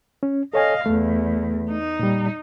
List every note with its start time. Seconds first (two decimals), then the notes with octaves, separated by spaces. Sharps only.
0.23 C#4
0.54 A4 C#5 D#5 F5 G#5
0.86 E2 A3
1.69 D#4
1.99 A#2 G3